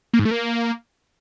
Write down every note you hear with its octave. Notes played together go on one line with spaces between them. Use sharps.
A#3
G#2
A3
A#3